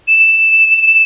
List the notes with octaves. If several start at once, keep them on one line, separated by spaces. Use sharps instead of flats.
E7